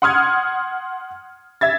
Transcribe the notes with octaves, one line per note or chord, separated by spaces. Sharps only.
F#5 C6 D#6 F6 G#6
E5 G#6 A6